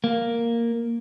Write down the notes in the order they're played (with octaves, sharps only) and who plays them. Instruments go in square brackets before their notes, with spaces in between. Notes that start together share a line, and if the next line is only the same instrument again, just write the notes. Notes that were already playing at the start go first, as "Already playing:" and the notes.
[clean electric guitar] A#3